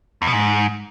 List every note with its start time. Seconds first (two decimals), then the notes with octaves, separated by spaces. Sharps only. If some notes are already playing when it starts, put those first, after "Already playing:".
0.22 E2
0.27 B2
0.33 G#2